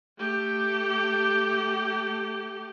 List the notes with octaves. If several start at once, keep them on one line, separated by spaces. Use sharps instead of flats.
A3 G4